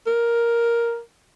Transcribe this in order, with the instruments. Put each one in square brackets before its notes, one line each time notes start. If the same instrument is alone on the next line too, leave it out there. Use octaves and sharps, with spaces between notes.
[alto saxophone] A#4